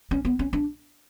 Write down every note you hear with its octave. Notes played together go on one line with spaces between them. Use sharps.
C#4
B3
C#4
D4